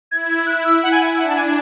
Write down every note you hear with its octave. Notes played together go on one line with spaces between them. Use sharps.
E4 G#6
G#6
F#6
E6
F#5
G#5
D4 F#5
A5
G#5